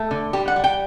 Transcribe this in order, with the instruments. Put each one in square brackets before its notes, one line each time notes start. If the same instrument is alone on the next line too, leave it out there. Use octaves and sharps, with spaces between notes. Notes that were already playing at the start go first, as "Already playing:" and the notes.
Already playing: [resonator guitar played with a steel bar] A3
D3
G3 G4
F#5
G3
G5